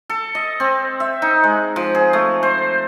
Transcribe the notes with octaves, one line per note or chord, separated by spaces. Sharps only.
A4
D#5
C4
E5
D#4
G#3
F3
G#4
A3
C5